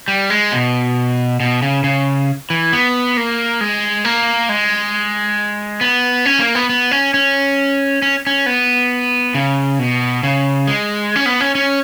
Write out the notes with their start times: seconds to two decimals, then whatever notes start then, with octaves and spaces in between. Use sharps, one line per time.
0.08 G3
0.30 G#3
0.52 B2
1.40 B2
1.62 C#3
1.84 C#3
2.50 E3
2.73 B3
3.17 A#3
3.61 G#3
4.05 A#3
4.49 G#3
5.81 B3
6.25 C#4
6.40 A#3
6.55 B3
6.69 B3
6.91 C#4
7.14 C#4
8.02 C#4
8.27 C#4
8.46 B3
9.35 C#3
9.79 B2
10.23 C#3
10.67 G#3
11.16 C#4
11.26 B3
11.41 C#4
11.55 C#4